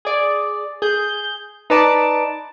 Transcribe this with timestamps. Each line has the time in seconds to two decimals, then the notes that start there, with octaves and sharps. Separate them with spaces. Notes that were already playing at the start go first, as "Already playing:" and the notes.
0.05 G#4 D5
0.82 G#4 G6
1.70 D#4 B4 D5 A5 D6